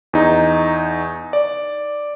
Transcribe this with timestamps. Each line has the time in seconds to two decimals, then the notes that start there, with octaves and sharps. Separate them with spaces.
0.13 E2 D#4
1.33 D5